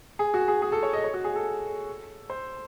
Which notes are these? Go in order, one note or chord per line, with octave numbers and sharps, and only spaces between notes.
G#4
F#4
G#4
G#4
A4
C#5
D#5
C#5
F#4
G#4
A4
C5